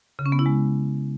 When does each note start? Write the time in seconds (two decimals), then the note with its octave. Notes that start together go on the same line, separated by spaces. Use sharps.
0.19 C#3
0.26 C#4
0.32 B3
0.39 E4
0.46 G#3